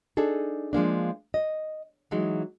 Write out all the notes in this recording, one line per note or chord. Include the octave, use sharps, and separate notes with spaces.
D4 D#4 G#4 A4
F3 G#3 A#3 D4
D#5
E3 F#3 G#3 D#4